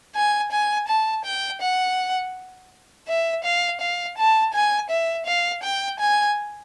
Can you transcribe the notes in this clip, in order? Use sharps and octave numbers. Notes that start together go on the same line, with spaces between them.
G#5
G#5
A5
G5
F#5
E5
F5
F5
A5
G#5
E5
F5
G5
G#5